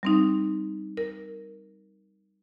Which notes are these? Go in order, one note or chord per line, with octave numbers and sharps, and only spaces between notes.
G3 C4 D#4
A#4